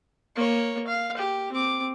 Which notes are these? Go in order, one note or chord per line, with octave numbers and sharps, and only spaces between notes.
A#3 C#5
F5
G4
C4 D6